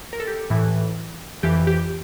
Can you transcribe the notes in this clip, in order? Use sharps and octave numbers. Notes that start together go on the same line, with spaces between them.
A#4
A4
G4
A2 E3
F2 E3 G4
G4